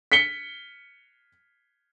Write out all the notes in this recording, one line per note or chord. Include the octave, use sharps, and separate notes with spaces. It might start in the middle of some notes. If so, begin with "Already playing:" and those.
B6 C#7 G7